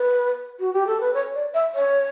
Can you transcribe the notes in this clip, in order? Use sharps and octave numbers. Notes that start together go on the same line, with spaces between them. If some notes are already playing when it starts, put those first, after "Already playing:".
Already playing: B4
F#4
G4
A4
B4
C#5
D5
E5
C#5